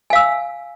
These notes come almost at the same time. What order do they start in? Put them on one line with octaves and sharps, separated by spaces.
G#5 F5 E6